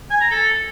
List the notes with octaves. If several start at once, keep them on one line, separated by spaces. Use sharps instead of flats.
G#5
A#5
A4